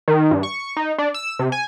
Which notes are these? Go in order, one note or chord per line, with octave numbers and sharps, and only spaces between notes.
D#3
G2
C#6
D#4
D4
E6
C3
G#5